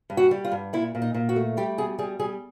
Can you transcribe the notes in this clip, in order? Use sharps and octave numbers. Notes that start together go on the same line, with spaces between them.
G2
F#4
G3
F4
G2
A#2 E4
A#2
D#4
A#2
F#4
A3
G3 G4
B2 G#4
G3 G#4
G3 G#4